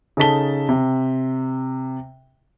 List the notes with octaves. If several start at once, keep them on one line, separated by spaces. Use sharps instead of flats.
C#3 D#4 A4 A5 B6 G7
C3